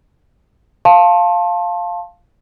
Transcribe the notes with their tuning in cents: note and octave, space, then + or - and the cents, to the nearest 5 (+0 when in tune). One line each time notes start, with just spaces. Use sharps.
F5 +0 A5 +0 C6 +35